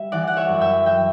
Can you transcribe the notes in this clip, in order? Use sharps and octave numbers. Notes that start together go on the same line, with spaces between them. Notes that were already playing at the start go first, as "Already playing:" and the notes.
Already playing: G3 E5
E3 D5 F#5
F#5
C#5 E5
F#2
E5 G5
F#3 E5 G5